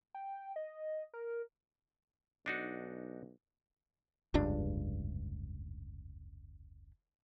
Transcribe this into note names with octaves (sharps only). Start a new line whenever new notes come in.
G5
D#5
A#4
B1 D4 D#4 F#4
F1 C#2 G2 D4